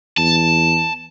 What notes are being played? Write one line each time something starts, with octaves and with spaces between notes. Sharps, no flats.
E2 A5